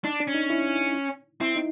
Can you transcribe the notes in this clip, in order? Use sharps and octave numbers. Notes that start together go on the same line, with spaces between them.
D4 D#4
D4
C#4
D#4
E4
C4 E4
D#4